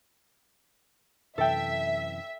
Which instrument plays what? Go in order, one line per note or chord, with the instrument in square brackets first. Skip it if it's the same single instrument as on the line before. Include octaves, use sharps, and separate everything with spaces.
[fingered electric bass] F#2 C3 E3 [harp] A4 G5 [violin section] E5